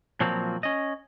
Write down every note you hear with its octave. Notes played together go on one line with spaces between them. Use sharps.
A#2 F3 F#3 A#3 C4
C#4 D#5